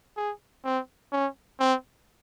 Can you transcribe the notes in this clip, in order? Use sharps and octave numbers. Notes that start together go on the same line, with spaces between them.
G#4
C4
C#4
C4